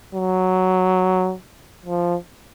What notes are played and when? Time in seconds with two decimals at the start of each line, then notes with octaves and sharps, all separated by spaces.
0.15 F#3
1.86 F3